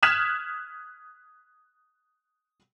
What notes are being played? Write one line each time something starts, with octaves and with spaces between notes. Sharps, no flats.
D#6 F6 F#6 G#6 B6 E7